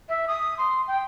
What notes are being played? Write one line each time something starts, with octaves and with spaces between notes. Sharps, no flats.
E5
D#6
C6
G5